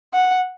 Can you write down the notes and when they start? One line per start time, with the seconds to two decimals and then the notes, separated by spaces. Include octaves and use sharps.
0.14 F#5